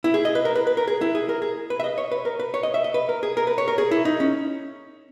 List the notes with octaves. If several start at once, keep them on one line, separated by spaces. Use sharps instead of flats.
E4
G#4
D#5
B4
A#4
B4
B4
A#4
G#4
E4
G#4
A#4
G#4
B4
E5
D#5
C#5
B4
A#4
B4
C#5
D#5
E5
D#5
B4
A#4
G#4
A#4
B4
C#5
A#4
G#4
E4
D#4
C#4